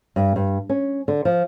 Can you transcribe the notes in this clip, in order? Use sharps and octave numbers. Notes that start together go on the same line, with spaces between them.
G2
G2
C#4
D3
F3